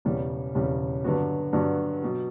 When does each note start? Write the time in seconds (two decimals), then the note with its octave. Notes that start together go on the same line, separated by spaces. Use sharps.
0.05 E1 E2 C#3 G3
0.55 E1 E2 C#3 G3
1.04 G2 D3 F#3 B3 F#4
1.53 G2 D3 F#3 B3 F#4
2.02 B2 F#3